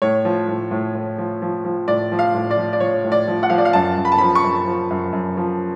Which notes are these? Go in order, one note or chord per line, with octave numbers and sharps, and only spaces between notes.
A2 C#5
F3
A2
A2
A2
F3
F3
F3
A2 D5
F3
F5
A2
D5
F3
D5
F3 C#5
A2
D5
F3
F#5
F3 F5
D5
F5
F#2 A5
F#2
B5
A5
F3 B5
C#6
F#2
F3
F#2
F#2
F3